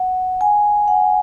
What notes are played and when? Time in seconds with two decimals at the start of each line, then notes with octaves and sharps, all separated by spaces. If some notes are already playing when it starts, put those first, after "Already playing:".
Already playing: F#5
0.41 G#5
0.88 F#5